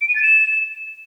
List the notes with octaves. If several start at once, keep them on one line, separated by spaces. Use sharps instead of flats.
D7
D#7
A6
E7